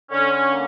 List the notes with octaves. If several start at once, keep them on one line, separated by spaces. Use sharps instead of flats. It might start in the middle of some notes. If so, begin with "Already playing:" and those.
D3 C#4
C#4
A#3